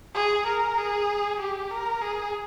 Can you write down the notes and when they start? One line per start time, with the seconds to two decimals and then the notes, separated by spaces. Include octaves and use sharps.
0.14 G#4
0.46 A#4
0.78 G#4
1.39 G4
1.71 A#4
2.02 G#4